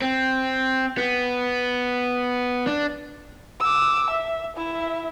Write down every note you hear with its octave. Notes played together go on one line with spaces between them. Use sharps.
C4
B3
D4
D6 E6
E5
E4 E5